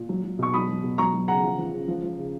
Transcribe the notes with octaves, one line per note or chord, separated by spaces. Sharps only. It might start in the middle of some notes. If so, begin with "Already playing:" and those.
Already playing: A#2
F#3
F#3
B2 C#6
F#3 B5 D#6
F#3
B2
F#3 A#5 C#6
F#3
C#3 F#5 A#5
F3
F3
C#3
F3
F3
C#3